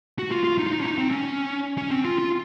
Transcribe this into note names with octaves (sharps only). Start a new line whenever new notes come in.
F#4
F4
F4
D#4
F4
D#4
C#4
D#4
C4
C#4
C#4
C4
F4
F4